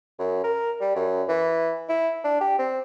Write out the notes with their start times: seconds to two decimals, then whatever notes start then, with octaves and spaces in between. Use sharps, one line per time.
0.19 F#2
0.44 A#4
0.81 G3
0.95 F#2
1.29 E3
1.89 E4
2.24 D4
2.41 G4
2.59 C4